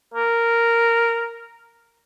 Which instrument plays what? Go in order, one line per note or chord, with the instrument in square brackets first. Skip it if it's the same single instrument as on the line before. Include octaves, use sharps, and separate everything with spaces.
[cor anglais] A#4